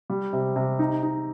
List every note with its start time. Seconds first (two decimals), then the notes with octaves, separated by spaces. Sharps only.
0.10 G3
0.33 C3
0.56 C3
0.79 D#4
1.03 D#4